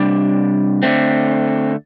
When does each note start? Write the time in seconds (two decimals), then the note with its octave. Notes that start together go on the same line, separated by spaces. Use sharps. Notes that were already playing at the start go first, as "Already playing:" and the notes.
Already playing: C3 G3 D4
0.83 D3 A3 C4